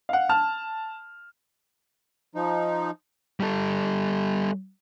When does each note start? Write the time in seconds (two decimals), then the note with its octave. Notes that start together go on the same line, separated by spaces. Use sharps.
0.09 F5 F#5
0.29 A5 F6
2.35 F3 D#4
3.40 G3 A4